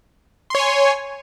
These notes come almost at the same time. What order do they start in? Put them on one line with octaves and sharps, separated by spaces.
C6 C#5 G#5